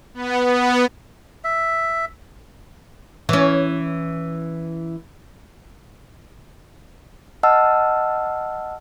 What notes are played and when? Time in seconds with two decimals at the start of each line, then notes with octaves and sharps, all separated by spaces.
0.14 B3
0.46 B3
1.44 E5
3.29 E3 C#4
7.43 D#5 F#5 A5 E6 F6